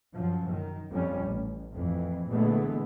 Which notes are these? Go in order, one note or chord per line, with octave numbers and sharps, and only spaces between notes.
F#2 F3
D#3
F2 G3 C#4
A1
F2 E3
A#2 D3 E3 G#3 A3 B3